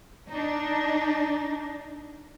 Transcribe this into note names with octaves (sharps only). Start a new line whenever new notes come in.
D4 D#4